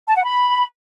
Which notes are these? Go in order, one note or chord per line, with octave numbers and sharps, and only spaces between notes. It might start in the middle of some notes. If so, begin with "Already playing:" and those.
A5
F#5
B5